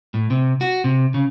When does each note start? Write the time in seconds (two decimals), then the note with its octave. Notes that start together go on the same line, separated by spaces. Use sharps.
0.14 A2
0.30 C3
0.61 F#4
0.84 C3
1.14 C#3